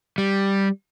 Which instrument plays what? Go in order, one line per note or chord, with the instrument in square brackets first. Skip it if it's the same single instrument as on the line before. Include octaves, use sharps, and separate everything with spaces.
[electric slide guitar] G3